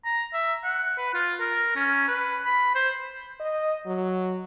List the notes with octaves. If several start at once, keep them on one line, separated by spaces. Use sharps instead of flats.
A#5
E5
F#5
B4
F4
A#4
C#4
B4
B5
C5
D#5
F#3